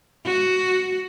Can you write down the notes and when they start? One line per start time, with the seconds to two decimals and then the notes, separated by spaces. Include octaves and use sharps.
0.25 F#4